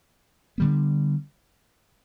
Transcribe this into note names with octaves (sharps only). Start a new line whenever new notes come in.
D3 G3 B3